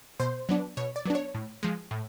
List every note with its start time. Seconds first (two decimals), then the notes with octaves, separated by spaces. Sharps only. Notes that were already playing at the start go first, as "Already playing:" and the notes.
0.19 B2 C5
0.49 F#3 B3 D4
0.77 B2 C#5
0.96 D5
1.05 F#3 B3 D4
1.15 C#5
1.34 A2
1.63 F3 G#3
1.91 A2